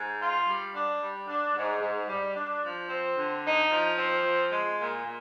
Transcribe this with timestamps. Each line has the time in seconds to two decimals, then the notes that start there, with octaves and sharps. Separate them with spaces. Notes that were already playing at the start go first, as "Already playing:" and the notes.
Already playing: G#2
0.20 F4
0.48 G3
0.74 D4
1.01 G3
1.27 D4
1.55 G#2
1.81 G#2
2.09 G3
2.35 D4
2.62 F3
2.89 C4
3.16 D3
3.43 D#4
3.70 F3
3.97 C4
4.24 F3
4.51 G#3
4.78 A#2
5.04 A#2